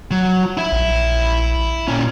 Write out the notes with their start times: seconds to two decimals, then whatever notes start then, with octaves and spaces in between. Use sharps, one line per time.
0.11 F#3
0.57 E4 E5
0.72 A#1
1.88 A#2 C#4